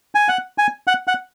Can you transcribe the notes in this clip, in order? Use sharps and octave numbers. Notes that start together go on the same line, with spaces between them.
G#5
F#5
G#5
F#5
F#5